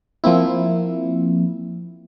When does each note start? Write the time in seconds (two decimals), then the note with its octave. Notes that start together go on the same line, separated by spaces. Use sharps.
0.24 F3 A#3 C4 E4